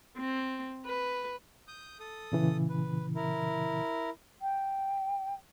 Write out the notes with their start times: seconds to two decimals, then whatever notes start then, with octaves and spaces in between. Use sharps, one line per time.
0.18 C4
0.86 B4
1.68 D#6 G6
2.00 A4 D#6
2.32 A#2 C#3 E3
2.69 B4
3.15 E4 A#4
4.41 G5